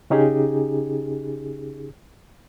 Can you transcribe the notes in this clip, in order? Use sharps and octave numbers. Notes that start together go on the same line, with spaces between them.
C#3 C#4 D#4 G4 G#4